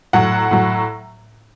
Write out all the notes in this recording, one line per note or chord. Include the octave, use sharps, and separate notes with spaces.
A2 F#3 F#5
A2 F#3